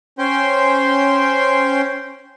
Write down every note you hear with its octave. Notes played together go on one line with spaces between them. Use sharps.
C#4 C5 G5 C6